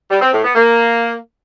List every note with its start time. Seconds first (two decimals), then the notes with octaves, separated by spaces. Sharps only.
0.10 G3
0.22 C4
0.33 A2
0.44 B3
0.55 A#3